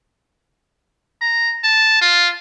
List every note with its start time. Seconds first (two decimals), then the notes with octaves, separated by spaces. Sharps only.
1.22 A#5
1.64 A5
2.01 F4